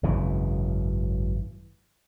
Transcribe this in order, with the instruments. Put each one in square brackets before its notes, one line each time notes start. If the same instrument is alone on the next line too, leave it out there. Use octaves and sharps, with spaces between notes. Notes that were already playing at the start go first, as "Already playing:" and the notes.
[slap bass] G#1 F#2 C#3 E3